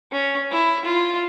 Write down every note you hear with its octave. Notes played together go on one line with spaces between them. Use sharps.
C#4
E4
F4